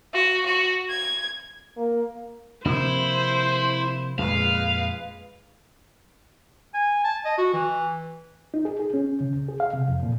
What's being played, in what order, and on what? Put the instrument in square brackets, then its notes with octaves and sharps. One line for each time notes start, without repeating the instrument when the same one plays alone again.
[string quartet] F#4
F#4
G#6
[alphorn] A#3
[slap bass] C3 F3 A#3 [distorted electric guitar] E4 [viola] C5
[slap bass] F2 A#2 [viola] G#3 B4 [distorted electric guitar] F5
[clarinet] G#5
A5
D#5
F#4
E3
[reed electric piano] D#4
G#4
G#4
C#4
C#3
C#2
G#4
F5
C3
F2
A#2